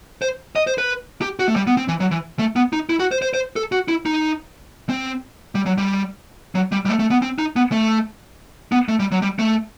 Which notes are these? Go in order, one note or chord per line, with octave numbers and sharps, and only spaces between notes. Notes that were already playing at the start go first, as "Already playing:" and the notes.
C5
D#5
C5
B4
G4
F#4
A3
G3
B3
C4
E3
F#3
E3
A3
B3
D#4
E4
F#4
C5
C5
C5
A4
F#4
E4
D#4
C4
G3
F#3
G3
F#3
G3
G3
A3
A3
B3
C4
D#4
B3
A3
B3
A3
G3
F#3
G3
A3